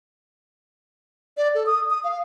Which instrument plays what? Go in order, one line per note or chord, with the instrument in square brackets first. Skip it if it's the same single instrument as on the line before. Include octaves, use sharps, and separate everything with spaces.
[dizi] D5
A4
D#6
D#6
F5